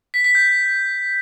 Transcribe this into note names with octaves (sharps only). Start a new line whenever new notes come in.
B6
B6
G6